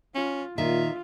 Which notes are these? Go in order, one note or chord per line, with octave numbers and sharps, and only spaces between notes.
C#4 F4
A#2 D#3 F4 E5